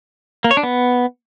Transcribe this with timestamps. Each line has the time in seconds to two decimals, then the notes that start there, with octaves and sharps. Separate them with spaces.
0.44 A#3
0.51 C#5
0.57 D4
0.63 B3